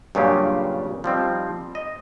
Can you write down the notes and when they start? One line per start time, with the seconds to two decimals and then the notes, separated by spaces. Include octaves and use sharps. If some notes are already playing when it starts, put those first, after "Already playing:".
0.15 G2 A#2 C#3 F#3 F4 G4
1.04 F3 G3 C4 D#4
1.75 D#5